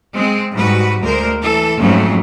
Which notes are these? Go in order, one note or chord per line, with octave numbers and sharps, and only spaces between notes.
G#3 C4
G#2 G3 F#4 B4
D2 G#3 A#4 C5
E3 A4
F2 G#2 F#3 A3 C4 C#4